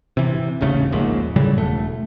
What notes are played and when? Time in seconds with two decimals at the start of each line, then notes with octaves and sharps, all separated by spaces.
0.17 C3 E3
0.61 D#1 A1 C#3 A3
0.92 D#1 A#1 D#2 G#2
1.36 A2 C#3 F#3 G3
1.58 E1 A3